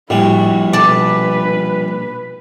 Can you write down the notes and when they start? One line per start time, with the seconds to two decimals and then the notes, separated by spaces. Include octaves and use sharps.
0.10 A#1 A2 G3 E4 F#4
0.73 B2 B4 D5 A5